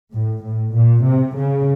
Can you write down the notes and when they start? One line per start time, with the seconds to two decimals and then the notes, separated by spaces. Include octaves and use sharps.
0.13 A2
0.44 A2
0.74 A#2
1.05 C3
1.36 C#3